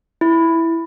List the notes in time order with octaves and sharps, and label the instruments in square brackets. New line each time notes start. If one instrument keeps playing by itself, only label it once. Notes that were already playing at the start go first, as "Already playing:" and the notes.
[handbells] E4